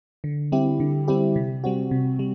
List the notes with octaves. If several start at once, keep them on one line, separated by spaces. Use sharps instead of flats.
D3
G3 C4 E4 G4
D3
G3 C4 E4 G4
C3
G3 C4 F#4
C3
G3